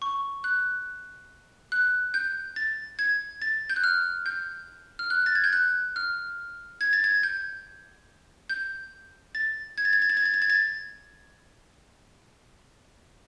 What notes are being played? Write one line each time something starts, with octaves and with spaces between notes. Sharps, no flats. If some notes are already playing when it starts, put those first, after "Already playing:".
C#6
F#6
F#6
G6
A6
G#6
A6
G6
F#6
F6
G6
F6
F#6
A6
G#6
G6
F#6
F6
G#6
A6
G#6
G6
G6
A6
G#6
A6
G#6
A6
G#6
A6
G#6
A6
G#6
A6